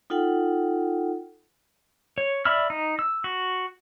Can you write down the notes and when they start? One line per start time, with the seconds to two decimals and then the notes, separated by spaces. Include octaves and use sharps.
0.10 D#4 F4 A4 F#5 G5
2.18 C#5
2.45 D5 E5 B5 E6 F6
2.70 D#4
2.99 E6
3.24 F#4